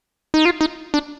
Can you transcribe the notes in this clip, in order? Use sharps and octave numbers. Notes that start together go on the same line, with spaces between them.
D#4
F4
D#4
D4